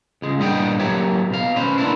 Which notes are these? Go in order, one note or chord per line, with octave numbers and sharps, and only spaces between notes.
C#2 G#3
G2 A#2 B3 D#5 F#5 G5
F#3 A#3 G4 C#5 E5
B2 F5
C#4 B4 C5
A#3 D4 E4